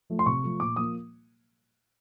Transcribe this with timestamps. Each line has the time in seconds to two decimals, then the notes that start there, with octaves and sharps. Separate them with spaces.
0.10 F3 A3
0.19 C6
0.26 C3 C#6
0.43 F3 A3
0.60 A#2 D6
0.76 F3 A#3 D#6